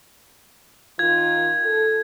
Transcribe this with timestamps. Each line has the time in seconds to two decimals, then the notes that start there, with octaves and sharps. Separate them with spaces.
0.99 D#3 F4 G#6
1.64 A4